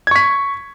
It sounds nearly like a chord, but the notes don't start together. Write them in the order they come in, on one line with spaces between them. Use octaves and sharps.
G#6 C#6 B6